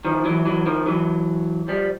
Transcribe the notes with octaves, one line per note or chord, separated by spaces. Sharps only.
D#3 F3
E3 F#3
E3 F#3
D#3 F3
E3 F#3
F3 G3